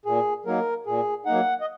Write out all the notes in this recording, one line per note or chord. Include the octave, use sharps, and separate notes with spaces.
A#2 G#4
F#3 A#3 D#4 A#4
A#2 G#4
F#3 A#3 D#4 F#5
D#5